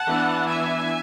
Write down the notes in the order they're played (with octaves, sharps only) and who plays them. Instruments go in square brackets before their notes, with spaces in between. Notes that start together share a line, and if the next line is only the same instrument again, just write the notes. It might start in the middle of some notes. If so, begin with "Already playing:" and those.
Already playing: [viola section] F#5 A5
E3 B3 D4
E5 G#5